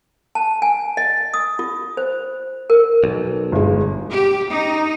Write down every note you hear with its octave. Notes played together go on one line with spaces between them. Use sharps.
A5
G#5
D#5
D#6
F4
C5
A#4
B1
G1 G#3
G4
D#4